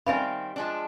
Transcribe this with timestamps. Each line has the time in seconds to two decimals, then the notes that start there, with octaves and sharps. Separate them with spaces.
0.06 D#3 G3 C4 E5 F5 G#5 B5
0.56 F3 G#3 D4